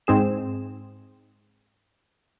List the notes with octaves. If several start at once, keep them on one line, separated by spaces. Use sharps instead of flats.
G#2 C4 G#4 E7